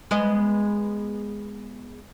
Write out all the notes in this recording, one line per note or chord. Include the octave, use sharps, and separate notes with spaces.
G#3 B3 D#5